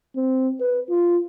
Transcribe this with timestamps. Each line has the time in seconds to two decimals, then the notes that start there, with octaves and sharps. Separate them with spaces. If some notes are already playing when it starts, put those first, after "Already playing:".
0.16 C4
0.60 B4
0.89 F4